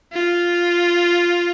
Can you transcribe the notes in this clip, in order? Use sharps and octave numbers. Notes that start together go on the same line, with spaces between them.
F4